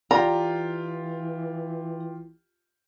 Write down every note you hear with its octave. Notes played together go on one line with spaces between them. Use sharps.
E3 F4 G4 D5 A#5